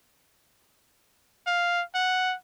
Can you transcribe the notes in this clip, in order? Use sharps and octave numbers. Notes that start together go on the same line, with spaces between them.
F5
F#5